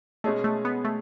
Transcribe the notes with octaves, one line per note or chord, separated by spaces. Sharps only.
B2 G#3 A3 C#4 G#4 D#5
A3
B3
A3